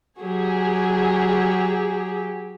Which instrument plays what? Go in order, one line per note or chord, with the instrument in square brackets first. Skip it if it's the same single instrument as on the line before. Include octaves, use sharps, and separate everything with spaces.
[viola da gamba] F#3 G4 [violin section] G#4